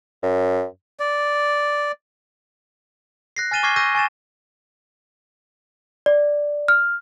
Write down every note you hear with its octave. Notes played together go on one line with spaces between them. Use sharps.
F#2
D5
F#6 A#6 C7
G#5 F6 A6 D#7 E7 G7
C#6 D6 F6 G#6 A#6 C7
C#6 E6 G6 A#6 D#7
G#5 C#6 A6 E7
D5
F6